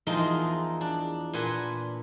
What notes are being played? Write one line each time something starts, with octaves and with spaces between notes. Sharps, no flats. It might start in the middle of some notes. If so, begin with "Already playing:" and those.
E2 F3 G#3 D#4 A#4 C6
D4
A#2 B4 F#5 G#5 C6